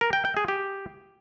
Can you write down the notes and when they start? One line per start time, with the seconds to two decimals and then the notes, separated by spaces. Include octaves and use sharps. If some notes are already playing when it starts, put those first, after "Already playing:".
0.01 A#4
0.13 G5
0.25 G5
0.37 G#4
0.48 G4